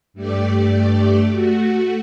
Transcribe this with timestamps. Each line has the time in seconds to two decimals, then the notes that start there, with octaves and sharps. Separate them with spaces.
0.14 G2 A3 G4 D5
1.31 A3 F#4